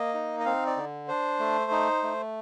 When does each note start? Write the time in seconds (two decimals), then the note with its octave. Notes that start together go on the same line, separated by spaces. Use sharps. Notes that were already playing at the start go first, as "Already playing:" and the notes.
Already playing: A#3 D#5
0.14 D#4
0.40 D#5
0.45 C4 F5
0.67 D5
0.77 D3
1.08 D4 C5
1.40 A3
1.72 D#4
2.03 A3